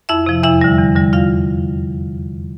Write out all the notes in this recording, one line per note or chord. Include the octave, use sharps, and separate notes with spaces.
F2 E4 E5
C3 F3
E2 E4 E5
D3 G3
E2
D3 G3
F4 F5